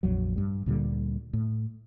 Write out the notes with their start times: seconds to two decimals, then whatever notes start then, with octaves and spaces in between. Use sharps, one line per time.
0.03 A#1 F2 F#3
0.36 G2 G3
0.66 D2 A#2 D3 G3
1.33 A2